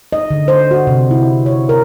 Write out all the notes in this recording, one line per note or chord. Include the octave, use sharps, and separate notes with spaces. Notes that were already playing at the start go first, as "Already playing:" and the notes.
D#5
D3
C5
F#4
C3
E4
C#5
A#4